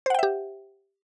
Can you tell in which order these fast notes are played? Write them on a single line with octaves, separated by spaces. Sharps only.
C5 F#5 G5 E5 G4